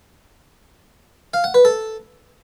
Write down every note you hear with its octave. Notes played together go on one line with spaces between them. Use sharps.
F5
F#5
B4
A4